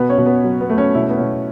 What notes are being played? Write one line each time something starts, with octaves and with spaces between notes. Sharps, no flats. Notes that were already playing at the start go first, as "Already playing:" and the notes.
Already playing: B2 B3 B4
C#4 C#5
B2
B3
F#3
B3
A3
C#4
B2 E4
C#4
B3
B2 C#4